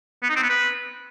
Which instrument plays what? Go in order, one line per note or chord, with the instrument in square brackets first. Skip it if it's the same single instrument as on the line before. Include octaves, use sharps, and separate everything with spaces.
[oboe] B3
D#4
C4
B3
B4